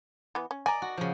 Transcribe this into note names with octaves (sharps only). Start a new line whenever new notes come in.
E3 B3
C#4
D5 D#5 G#5 A#5
F#4
C#3 F3